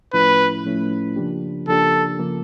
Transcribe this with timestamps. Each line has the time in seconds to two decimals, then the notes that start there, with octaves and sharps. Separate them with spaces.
0.13 A2 F3 A3 C#4 E4 B4
0.65 A2 F3 A3 C#4 E4
1.16 C#3 F3 A#3 D4 G4
1.67 C#3 F3 A#3 D4 G4 A4
2.19 C#3 F3 A#3